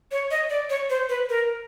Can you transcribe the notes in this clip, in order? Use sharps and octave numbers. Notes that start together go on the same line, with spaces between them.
C#5
D#5
D5
C#5
C5
B4
A#4